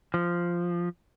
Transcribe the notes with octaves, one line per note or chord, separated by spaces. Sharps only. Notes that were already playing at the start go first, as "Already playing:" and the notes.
F3